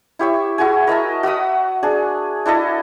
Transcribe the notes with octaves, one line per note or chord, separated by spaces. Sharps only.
E4 G4 C#5 E5
E4 F#4 G#4 G#5
A#4 D#5 E5 A5
F#4 E5 B5 D#6
D4 G#4
D4 E4 A4 D#5